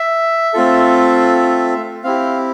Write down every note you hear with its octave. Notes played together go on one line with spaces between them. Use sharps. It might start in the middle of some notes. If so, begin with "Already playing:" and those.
Already playing: E5
A3 C4 F4 A4
C4 E4 G4 F5